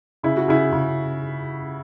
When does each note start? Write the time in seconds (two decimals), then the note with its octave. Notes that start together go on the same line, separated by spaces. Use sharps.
0.23 C#3 E4
0.37 F#4
0.48 C#3 E4
0.72 C#3